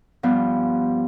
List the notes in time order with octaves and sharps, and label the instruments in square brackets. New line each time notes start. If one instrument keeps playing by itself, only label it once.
[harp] G2 F3 B3 F4 G4